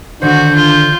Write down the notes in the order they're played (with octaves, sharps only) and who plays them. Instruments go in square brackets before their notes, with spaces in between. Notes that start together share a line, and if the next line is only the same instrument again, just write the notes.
[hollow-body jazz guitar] D3 D#3 C5 [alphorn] D4 [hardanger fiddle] F#4 [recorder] G6
[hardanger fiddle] F4